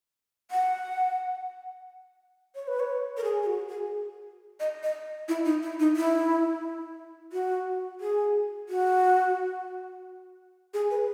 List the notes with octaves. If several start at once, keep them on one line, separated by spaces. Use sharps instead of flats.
F#5
C#5
B4
C#5
A#4
G#4
G#4
F#4
G#4
D#5
D#5
E4
D#4
E4
D#4
E4
F#4
G#4
F#4
G#4
B4